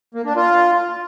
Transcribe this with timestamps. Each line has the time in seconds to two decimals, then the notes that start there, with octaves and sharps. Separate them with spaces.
0.15 A#3
0.25 D4
0.36 F4